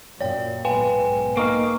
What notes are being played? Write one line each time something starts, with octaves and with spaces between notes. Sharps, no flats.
F#2 A#2 C#5 D5 G5
B1 G#2 B4 F5 G5 G#5
A#3 D#4 F5 C#6